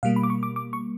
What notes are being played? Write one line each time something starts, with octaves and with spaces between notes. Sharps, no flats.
B2 G3 A#3 F5
B5
D6
C#6
D6
D6
C#6